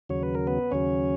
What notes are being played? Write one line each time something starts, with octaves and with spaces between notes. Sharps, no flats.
D#2 C#3 F#3 C#5
B4
A#4
B3 B4
D#2 C#3 F#3 C#4 C#5